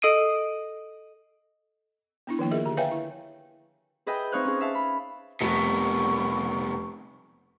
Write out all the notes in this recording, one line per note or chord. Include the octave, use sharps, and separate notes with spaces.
A4 D#5 D#6 C7 D7 D#7
B3 D4 E4
D#3 F3 A#3 E4
F4 G#4 A#4 D#5 E5
D3 G4
B4 C#5 E5 F5 G5 G#5
E4
G#4 B4 D#5 E5 G5
C4 D#4 C#5 F5 F#6
C#4 G#4
E5 F5 A5
B5
F1 C2 B2 C#6